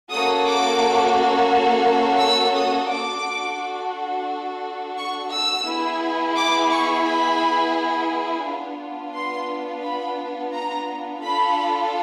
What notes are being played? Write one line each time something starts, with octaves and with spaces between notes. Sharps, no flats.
A#3 C#4 F#4 A4 D#6
D6
E6
D#6
D4 F#4 A4 D6
C#6
E6
B3 E4 G#4
D6
C#6
B5
B3 D4 F4
C6
B5
A#5
D4 F4 A4 B5